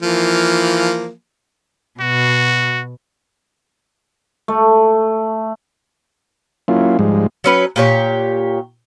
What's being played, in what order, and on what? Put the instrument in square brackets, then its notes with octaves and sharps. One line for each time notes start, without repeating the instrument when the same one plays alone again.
[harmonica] E3 F3 A#3
[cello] B2 [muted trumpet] F#4
[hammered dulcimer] A3
[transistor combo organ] F#3 A#3 C#4 E4 F4
G#2 F3 G3 G#3
[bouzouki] F#3 C#4 B4
A#2 G4 C#5